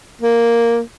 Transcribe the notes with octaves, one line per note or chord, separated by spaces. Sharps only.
A#3